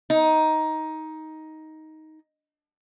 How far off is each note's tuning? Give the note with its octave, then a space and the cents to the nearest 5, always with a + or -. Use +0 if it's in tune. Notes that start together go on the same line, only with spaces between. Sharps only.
D#4 +10